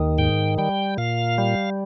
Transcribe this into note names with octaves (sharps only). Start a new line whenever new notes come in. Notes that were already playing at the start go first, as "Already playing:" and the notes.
Already playing: D#2 D#3
G#2 G5
G3 G5
A#2 F5
G3